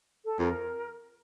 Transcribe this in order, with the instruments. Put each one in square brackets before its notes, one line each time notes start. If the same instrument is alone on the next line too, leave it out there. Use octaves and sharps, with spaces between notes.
[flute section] A4
[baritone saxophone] F2 [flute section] A#4